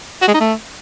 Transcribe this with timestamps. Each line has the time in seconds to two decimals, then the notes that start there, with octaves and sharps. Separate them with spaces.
0.22 F#4
0.28 G#3
0.34 D#4
0.41 A3